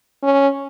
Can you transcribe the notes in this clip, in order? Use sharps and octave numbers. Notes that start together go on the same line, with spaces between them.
C#4